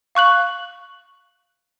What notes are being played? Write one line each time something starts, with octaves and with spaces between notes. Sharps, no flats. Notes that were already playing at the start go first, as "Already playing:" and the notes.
F5 C#6 F#6 F#7